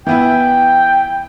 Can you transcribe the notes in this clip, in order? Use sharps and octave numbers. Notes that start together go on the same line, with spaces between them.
E3 B3 E4 G5